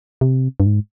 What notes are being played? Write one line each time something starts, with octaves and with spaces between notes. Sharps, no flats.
C3
G2
G#2